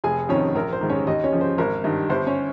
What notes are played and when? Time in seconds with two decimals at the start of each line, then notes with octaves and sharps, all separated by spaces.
0.04 F1 G#4 G#5
0.29 F2 D#3 C#4 C#5
0.55 A#1 A#4
0.73 C5
0.81 G#2 D#3
0.90 C#4 C#5
1.07 D#2 D#4 D#5
1.24 C#4 C#5
1.33 C#3 F3
1.41 C5
1.58 G#1 A#4
1.84 G2 D#3
2.10 G1 C5
2.26 C#4 C#5